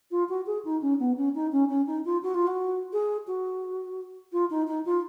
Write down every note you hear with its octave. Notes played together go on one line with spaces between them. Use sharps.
F4
F#4
G#4
D#4
C#4
B3
C#4
D#4
C#4
C#4
D#4
F4
F#4
F4
F#4
G#4
F#4
F4
D#4
D#4
F4